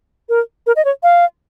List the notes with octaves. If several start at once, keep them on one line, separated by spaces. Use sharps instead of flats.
A#4
A#4
D#5
C#5
F5